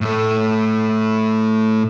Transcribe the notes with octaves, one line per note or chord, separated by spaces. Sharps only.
A2 A3